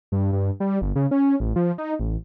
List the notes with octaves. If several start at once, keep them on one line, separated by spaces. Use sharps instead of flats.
G2
G2
G3
G1
C#3
C#4
A1
F3
D#4
A1